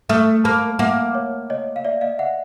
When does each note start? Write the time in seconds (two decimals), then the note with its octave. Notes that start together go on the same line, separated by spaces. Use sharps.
0.09 A3 D#6 F6
0.44 A#3 A5 B5
0.79 A#3 E5 F#5
1.15 C#5
1.50 C#5 D#5
1.76 F5
1.85 D5 E5
2.01 D#5 F5
2.19 E5 F#5